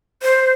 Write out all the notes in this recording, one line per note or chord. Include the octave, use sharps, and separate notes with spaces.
C5